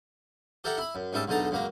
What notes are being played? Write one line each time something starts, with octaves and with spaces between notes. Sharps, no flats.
G4 A4 A#4 E5 F#5
E4 B5
F#2
G#2 G3 C#4 E5 A5
B1 E2 D3 D#4 A5 A#5
C#2 F#2 F#3 A#3 A#5